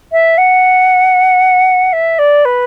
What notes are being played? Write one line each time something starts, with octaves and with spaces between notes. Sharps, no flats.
E5
F#5
E5
D5
B4